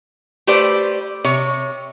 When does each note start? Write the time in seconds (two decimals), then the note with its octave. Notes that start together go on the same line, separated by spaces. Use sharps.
0.47 A3 G4 B4 C5 D5
1.25 C3 C#5